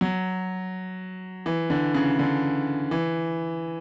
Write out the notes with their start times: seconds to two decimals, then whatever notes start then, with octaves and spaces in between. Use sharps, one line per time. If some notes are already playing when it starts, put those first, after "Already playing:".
0.01 F#3
1.46 E3
1.70 D3
1.94 C#3
2.19 D3
2.91 E3